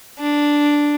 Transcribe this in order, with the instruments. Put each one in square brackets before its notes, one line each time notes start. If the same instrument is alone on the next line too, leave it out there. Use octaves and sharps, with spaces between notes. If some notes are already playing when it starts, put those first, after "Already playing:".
[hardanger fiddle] D4